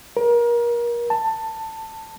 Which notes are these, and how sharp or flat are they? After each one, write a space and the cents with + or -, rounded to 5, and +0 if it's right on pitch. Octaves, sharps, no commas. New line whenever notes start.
A#4 +30
A5 +15